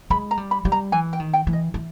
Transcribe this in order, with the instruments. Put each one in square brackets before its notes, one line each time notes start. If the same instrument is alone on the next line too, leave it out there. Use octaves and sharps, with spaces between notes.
[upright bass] G#3 [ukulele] B5
[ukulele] A#5
[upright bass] G3
[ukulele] B5
[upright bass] G3
[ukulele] A#5
[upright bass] E3 [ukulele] G#5
[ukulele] G5
[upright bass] D#3
[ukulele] G5
[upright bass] E3
[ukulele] D#5
[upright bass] E3